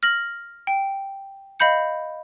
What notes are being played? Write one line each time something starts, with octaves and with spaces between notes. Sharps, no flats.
F6 A#6 F#7
G5
D#5 F5 B5 G6 C#7